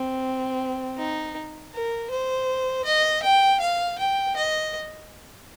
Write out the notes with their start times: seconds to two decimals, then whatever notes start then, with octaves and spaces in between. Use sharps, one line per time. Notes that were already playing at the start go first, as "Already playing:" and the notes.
Already playing: C4
0.97 D#4
1.73 A#4
2.10 C5
2.84 D#5
3.22 G5
3.60 F5
3.98 G5
4.36 D#5